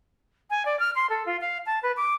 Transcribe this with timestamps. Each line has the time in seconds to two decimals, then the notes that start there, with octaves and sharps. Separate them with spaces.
0.50 G#5
0.65 D5
0.80 F6
0.95 C6
1.10 A4
1.26 F4
1.41 F5
1.66 A5
1.83 B4
1.97 D6